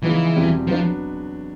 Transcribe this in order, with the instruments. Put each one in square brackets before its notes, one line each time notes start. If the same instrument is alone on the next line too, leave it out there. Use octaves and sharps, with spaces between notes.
[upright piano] C#3 F3 G#3 B3 D#4 [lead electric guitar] E3
[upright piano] E2 B2 G3 C4
[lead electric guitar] F3 [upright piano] F#3 B3 D4